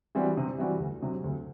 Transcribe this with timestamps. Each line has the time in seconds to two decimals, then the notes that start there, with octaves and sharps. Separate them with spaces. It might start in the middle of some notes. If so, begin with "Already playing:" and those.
0.15 E3 G3 C4 F#4
0.37 C3
0.59 E3 G3 C4 F#4
0.80 D2
1.03 C3 F#3
1.24 D2